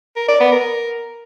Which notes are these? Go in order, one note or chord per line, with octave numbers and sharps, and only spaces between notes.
A#4
D5
B3
A#4